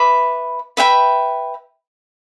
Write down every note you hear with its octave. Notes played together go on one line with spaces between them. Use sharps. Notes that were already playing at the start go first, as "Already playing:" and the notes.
Already playing: B4 E5 B5 D6
B4 E5 G5 B5